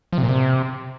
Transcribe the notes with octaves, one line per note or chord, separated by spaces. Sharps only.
F3
C3
A#2
C3